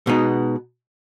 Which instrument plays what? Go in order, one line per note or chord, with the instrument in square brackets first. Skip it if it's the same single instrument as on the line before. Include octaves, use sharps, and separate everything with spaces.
[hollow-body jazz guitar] B2 G#3 B3 D#4